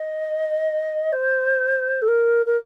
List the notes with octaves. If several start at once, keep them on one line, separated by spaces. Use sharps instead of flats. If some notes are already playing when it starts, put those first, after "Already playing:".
Already playing: D#5
C5
A4
A#4
A#4